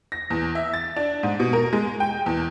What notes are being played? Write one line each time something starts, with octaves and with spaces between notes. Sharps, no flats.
A#6
E2
E5
A6
D4
G#2
B2
A#4
G#3
G5
E2